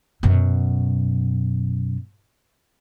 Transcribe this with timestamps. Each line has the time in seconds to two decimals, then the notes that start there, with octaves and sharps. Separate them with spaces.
0.23 F#2 B2